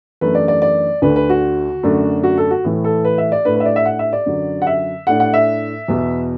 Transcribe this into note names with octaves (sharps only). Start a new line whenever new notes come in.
F#2 E3 A3 D4 B4
D5
D5
D5
D2 D3 A3 D4 B4
B4
F#4
F#2 D3 A3 D4
F#4
A4
F#4
A2 E3 A3
A4
B4
E5
D5
A2 A3 D4 B4
B4
E5
D5
E5
F#5
E5
D5
F#2 D3 F#3
F#5
E5
A2 A3 D4 F#5
F#5
E5
E2 B2 B3